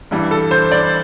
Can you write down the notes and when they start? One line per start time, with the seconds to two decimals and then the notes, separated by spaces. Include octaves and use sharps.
0.11 G2 E3 G3
0.31 A4
0.51 C5
0.72 D5